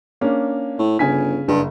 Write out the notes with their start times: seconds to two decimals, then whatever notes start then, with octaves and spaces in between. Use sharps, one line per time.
0.21 A#3 C#4 D4
0.78 A2
0.99 G1 C#3 G#5 B6
1.48 F#1 G2